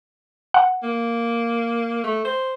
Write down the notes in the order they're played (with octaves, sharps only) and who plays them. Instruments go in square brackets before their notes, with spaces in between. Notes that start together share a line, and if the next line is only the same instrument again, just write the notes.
[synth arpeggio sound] F#5
[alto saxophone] A#3
A3
C5